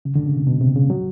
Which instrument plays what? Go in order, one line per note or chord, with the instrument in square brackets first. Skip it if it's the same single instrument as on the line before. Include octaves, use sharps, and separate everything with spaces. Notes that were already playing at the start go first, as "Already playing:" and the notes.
[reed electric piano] C#3
D3
C#3
C3
B2
C3
C#3
F#3